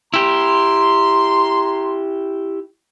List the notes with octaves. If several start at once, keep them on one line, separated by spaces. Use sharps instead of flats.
E4 G4 A#5 C6